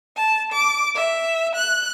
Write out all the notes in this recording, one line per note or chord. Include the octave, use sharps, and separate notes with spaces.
A5
D6
E5
F#6